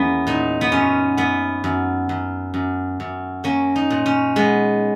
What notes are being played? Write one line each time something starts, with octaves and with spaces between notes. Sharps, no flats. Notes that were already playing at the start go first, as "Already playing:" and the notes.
Already playing: E2 A#3 B3 C#4
A#2 D#4
B3
F#2 C#4
F#2 B3
F#2
F#2
F#2
F#2
A#3 C#4
D#4
A#2
C#4
G#3 B3